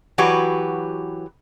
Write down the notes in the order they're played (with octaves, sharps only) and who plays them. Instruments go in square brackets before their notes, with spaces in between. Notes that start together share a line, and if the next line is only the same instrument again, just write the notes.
[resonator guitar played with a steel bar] E3 F#3 F#4 G4 B4